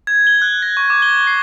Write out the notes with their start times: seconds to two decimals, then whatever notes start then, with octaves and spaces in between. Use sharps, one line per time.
0.07 G#6
0.27 G7
0.42 F#6
0.62 A#6
0.77 C#6
0.90 D6
1.02 G7
1.27 C7